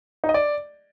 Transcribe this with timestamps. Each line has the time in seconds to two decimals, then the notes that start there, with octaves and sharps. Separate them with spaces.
0.24 D#4
0.29 D#5
0.34 D5